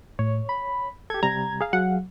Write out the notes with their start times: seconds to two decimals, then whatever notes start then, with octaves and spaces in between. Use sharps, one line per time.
0.19 A2 C#5
0.49 B5
1.10 G4 A4 G#6
1.23 C3 G3 A#5
1.61 G#4 F5
1.73 F#3 F#5